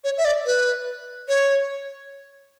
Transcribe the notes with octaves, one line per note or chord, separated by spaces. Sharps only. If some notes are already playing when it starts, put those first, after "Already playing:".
C#5
E5
D5
B4
C#5